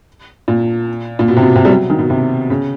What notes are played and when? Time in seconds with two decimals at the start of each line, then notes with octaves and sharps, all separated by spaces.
0.48 A#2
1.19 A#2
1.28 B2
1.37 C3
1.42 B2
1.55 C3
1.65 G3
1.69 F#3
1.90 D#3
1.99 B2
2.10 C3
2.50 C#3